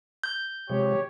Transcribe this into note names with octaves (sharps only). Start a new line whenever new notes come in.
G6
C3 F3 G#3 G4 C#5